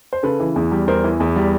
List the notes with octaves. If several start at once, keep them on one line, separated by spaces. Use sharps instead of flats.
C5
C#3 A4 B4
E3
E2
G3
E2 A#4 C5
E3
E2
G3